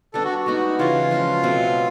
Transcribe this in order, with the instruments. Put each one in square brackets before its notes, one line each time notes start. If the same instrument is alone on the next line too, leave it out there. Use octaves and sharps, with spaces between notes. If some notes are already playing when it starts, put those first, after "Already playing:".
[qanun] G3 B3 D4 [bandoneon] A4
[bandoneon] F#4
[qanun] G#3 B3 D#4 [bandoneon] F#4
[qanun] C#3 E3 G#3 [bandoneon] F4
[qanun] F3 G#3 C#4 F#4
B2 F#3 A3 C4